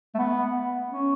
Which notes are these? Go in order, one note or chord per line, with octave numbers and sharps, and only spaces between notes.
A3
B3
C#4